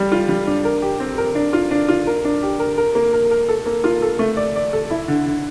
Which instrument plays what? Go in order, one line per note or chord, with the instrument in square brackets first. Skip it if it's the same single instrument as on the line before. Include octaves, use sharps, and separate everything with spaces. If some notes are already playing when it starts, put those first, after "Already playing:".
Already playing: [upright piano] G3
F4
G3
D4
A#4
G4
C4
A#4
D4
F4
D4
F4
A#4
D4
G4
A#4
A#4
A#3
A#4
A#4
A4
A#3
F4
A4
A3
D5
D5
A4
E4
D3
D3